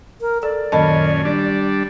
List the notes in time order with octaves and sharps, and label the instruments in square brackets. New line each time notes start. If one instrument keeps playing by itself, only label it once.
[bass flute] A#4
[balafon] A4 [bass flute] D5
[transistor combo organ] F#2 A#2 C#4 [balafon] D#3 D#5 A5
[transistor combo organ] G3 D4